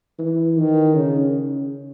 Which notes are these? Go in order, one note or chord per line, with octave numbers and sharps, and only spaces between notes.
E3
D#3
C#3